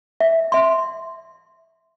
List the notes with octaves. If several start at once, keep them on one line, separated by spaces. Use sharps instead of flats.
E5
E5 C6